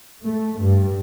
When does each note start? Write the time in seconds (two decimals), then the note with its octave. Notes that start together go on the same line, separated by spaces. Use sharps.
0.25 A3
0.59 G2